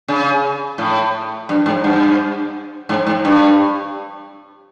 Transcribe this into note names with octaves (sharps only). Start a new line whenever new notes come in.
C#3
A2
G2
G#2
G2
G#2
G#2
G2